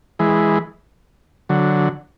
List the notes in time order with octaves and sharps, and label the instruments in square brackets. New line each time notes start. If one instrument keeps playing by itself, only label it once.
[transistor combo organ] E3 G#3
D3 F#3